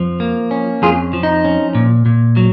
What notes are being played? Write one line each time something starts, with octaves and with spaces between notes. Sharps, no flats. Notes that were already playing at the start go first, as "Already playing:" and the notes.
Already playing: F2 F3
A#3
C#4
F2 F4 G#4
F3
D#4
C#4
A#2
A#2
F#3